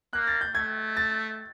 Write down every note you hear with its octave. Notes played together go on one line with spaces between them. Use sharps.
A#3 F#6
A6
G6
A3 G#6
A6